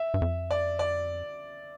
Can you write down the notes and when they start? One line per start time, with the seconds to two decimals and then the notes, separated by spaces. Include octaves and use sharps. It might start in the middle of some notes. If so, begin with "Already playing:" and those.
Already playing: E5
0.14 G2
0.22 F2
0.51 D5
0.79 D5